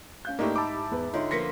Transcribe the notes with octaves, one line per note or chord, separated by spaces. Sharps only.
C#4 F5 G6
G#2 A3 A#3 D#4 E4 G4 D5 C#6
A5 B5 D6 E6
E2 B4
D3 D#4 F4 C#5 E5 G5
F3 A#3 B3 C6 A#6 B6 C#7